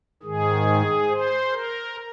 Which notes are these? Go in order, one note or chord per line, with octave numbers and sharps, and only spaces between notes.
G#2 D#3 G#4
C5
A#4